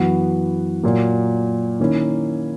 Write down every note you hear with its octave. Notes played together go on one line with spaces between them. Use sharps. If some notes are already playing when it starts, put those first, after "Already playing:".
Already playing: F#2 E3 B3 F#4
A#2 F#3 A#3
D#3 A#3 C#4 E4